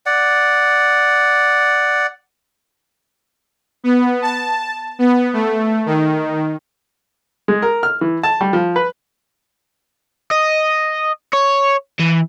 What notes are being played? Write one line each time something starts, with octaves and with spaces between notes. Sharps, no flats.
D5 F#5
B3
A5
B3
A3
D#3
G#3
A#4
F6
E3
A5
G3
F3
B4
D#5
C#5
E3